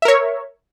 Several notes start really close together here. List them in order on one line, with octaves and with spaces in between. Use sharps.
E5 A#4 C#5